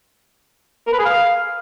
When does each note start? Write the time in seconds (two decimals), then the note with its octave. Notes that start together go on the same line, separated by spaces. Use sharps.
0.87 A#4
0.93 B4
0.99 G#4
1.05 F5